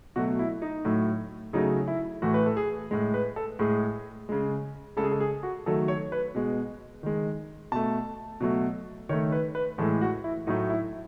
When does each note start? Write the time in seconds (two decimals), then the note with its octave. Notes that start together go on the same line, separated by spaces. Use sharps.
0.16 B2 F#3 A3 F#4
0.39 E4
0.62 D#4
0.85 A2 F#3 A3
1.53 C#3 F#3 A3 D#4
1.88 E4
2.22 A2 E3 A3 F#4
2.34 B4
2.46 A4
2.57 G#4
2.91 A2 G#3
3.14 B4
3.36 A4
3.59 A2 G#3 G#4
4.29 C#3 G#3
4.97 C#3 G#3 A4
5.04 G#4
5.12 A4
5.20 G#4
5.43 F#4
5.66 D#3 F#3 A3 A4
5.88 C#5
6.12 B4
6.35 B2 G#3
7.03 D#3 G#3
7.72 B2 A3 A5
8.41 B2 F#3 A3
9.09 D#3 C#5
9.13 A3
9.32 B4
9.55 B4
9.78 A2 E3 G#3 A4
10.01 F#4
10.24 E4
10.47 A2 F#3 A3 D#4
10.70 E4